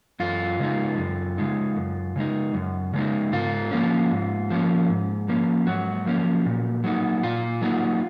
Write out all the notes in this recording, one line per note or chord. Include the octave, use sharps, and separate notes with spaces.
F#2 F4
C#3 G#3 D#4
F#2
C#3 G#3 D#4
F#2
C#3 G#3 D#4
F#2
C#3 G#3 D#4
G#2 F4
F3 A#3 C#4
G#2
F3 A#3 C#4
G#2
F3 A#3 C#4
G#2 F#3 F#4
F3 A#3 C#4
A#2
F#3 A#3 D#4
A#2 F4
F#3 A#3 D#4